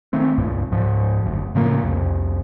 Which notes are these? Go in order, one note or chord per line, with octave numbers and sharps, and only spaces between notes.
D#3 A3 C4
C#2 G2 A#2
C#2 G#2 F3
F#1 D2
A2 C#3 F3 A#3
C2 F2